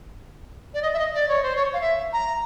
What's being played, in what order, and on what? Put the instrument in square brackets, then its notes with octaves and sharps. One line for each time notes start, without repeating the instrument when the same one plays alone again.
[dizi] D5
D#5
E5
D#5
D5
C#5
C5
C#5
F5
E5
A#5